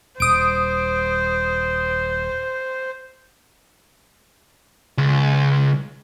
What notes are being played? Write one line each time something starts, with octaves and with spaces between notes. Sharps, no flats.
D#1 C5 D#6 D7
C#2